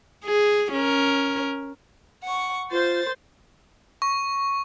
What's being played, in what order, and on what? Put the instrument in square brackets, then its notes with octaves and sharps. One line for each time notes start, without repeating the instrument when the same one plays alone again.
[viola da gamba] G#4
C#4 A#4
[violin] F#5 C#6
[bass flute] F4 [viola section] C5 [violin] A6
[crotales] C#6